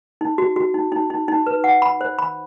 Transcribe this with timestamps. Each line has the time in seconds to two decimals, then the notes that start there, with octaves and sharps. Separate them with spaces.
0.21 D#4
0.38 F#4
0.56 F#4
0.74 D#4
0.92 D#4
1.10 D#4
1.28 D#4
1.47 B4
1.64 F#5
1.82 B5
2.01 C5
2.19 B5